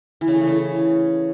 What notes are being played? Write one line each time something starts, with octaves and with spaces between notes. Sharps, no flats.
E3
C#3
A3
E3
C#3